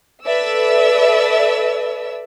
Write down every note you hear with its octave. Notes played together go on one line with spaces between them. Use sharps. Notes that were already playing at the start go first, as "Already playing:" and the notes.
A4 B4 D5 E5 E6